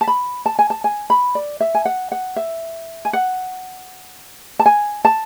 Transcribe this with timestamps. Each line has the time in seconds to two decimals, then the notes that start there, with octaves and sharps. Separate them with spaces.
0.01 A5
0.07 B5
0.46 A5
0.59 G#5
0.70 A5
0.84 G#5
1.10 B5
1.35 D5
1.60 E5
1.75 G#5
1.85 F#5
2.12 F#5
2.36 E5
3.05 G#5
3.13 F#5
4.59 A5
4.66 G#5
5.05 A5